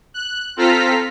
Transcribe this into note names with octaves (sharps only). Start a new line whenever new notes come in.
F#6
C4 F4 A4 A#5 F6 B6